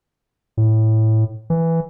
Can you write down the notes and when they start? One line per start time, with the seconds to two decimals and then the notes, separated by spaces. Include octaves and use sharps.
0.57 A2
1.50 E3